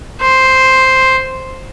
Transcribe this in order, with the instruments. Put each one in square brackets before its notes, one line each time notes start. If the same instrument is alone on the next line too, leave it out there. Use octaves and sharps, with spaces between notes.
[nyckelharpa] C5